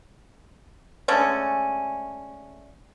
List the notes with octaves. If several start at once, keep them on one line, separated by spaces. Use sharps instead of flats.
D3 G#3 A3 C#4